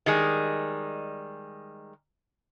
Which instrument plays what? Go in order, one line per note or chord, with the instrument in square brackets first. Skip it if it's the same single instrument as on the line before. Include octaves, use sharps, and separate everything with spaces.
[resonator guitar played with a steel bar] D#3 G3 G#3